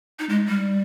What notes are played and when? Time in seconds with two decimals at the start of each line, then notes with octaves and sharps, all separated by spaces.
0.19 D#4
0.29 G#3
0.48 G3